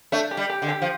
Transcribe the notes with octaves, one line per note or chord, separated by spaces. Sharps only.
A3 D4
G4
G3
G4
D3
G4
F3